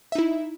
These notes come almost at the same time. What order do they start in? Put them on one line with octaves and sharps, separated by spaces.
E5 D#4 E4